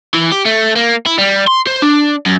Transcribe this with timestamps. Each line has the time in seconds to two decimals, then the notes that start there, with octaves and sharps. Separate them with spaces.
0.14 E3
0.32 G4
0.46 A3
0.76 A#3
1.06 E4
1.18 G3
1.47 C6
1.67 C5
1.82 D4
2.26 F#2